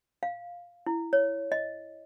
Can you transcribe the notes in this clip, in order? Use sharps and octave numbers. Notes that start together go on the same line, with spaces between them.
F5
E4
C#5
D#5